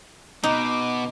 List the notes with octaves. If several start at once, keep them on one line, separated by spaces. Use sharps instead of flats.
B2 D#4 D6